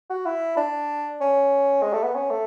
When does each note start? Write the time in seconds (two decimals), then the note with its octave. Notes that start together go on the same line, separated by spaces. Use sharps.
0.10 F#4
0.26 E4
0.57 D4
1.21 C#4
1.82 G#3
1.93 A3
2.04 B3
2.15 C#4
2.31 A3